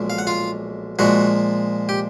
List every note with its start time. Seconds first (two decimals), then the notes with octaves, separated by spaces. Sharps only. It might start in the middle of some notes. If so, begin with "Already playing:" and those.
Already playing: B1 A#2 F3 G#3
0.10 F5
0.19 F#5
0.27 F4 F5
0.99 A#2 F3 G#3 F#4 F#5
1.89 G4 G5